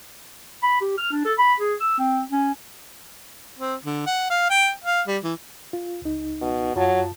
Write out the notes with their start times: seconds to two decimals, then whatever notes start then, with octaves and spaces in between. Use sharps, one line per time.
0.63 B5
0.81 G4
0.98 F6
1.11 D4
1.25 A4
1.38 B5
1.60 G#4
1.80 E6
1.99 C4
2.32 C#4
3.59 C4
3.85 D3
4.06 F#5
4.30 F5
4.50 G5
4.84 F5
5.07 G3
5.24 E3
5.73 F4
6.02 C#2 D#4
6.41 B2
6.76 F#2 F#3 F4 A5